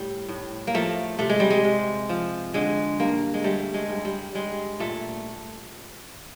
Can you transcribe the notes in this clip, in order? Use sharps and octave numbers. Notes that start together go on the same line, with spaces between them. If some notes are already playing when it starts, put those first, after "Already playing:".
Already playing: A2 G3
A2
A#3
F3 A3
C3 A3
G#3
G3
G#3
C3
F3
D3 G#3
G2 A#3
G#3
G3 A3
G#3
G2
G3
G3 G#3
A#2 A3